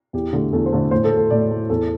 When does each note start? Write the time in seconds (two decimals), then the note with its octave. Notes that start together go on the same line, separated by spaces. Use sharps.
0.13 E2 G4
0.33 D3 A3
0.52 E2 A4
0.66 C5
0.72 D3 A3
0.91 A2 C5
1.04 A4
1.11 A3
1.17 A4
1.30 A2 D5
1.51 A3
1.69 E2 A4